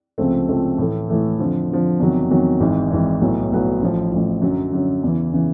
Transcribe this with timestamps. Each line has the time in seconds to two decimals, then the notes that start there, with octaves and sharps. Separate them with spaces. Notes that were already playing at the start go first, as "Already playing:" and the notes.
0.18 C#2 C3 F3 A3 C4
0.49 C#2 C3 F3 A3 C4
0.78 A2 E3 A3
1.09 A2 E3 A3
1.39 F2 D3 F3
1.69 F2 D3 F3
2.00 E2 C3 D#3 F#3
2.30 E2 C3 D#3 F#3
2.60 G#1 G#2 E3
2.91 G#1 G#2 E3
3.20 B1 A2 F#3 B3
3.51 B1 A2 F#3 B3
3.82 A1 A2 F3
4.12 A1 A2 F3
4.42 F#2 D3 F#3
4.73 F#2 D3 F#3
5.03 E2 C#3 E3
5.33 C#3 E3